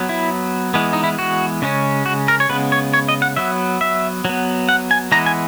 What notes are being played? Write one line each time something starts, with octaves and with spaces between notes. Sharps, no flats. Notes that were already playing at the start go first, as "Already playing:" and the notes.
Already playing: F#3 B3
E4
E3 G#3 B3
D#4
E4
F#4
C#3 G#3 C#4
F#4
A#4
C#5
C#3 G#3 B3 B4
C#5
C#5
D#5
F#5
F#3 B3 E5
E5
F#3 B3
F#5
G#5
E3 G#3 B3 A#5
G#5